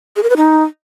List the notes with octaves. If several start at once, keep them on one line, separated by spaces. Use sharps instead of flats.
G#4
A#4
B4
D#4